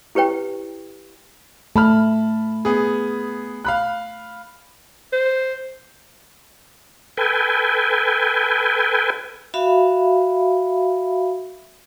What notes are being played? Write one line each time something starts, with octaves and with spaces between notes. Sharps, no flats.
E4 G4 B4 C#5 G5
A3 A5 B5 F6
B3 G#4
F5 B5 F#6
C5
A4 B4 G5 G#5
F#4 E5 F5 B5